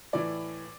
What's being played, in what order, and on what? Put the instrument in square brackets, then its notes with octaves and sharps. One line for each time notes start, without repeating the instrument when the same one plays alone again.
[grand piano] A2 E3 D5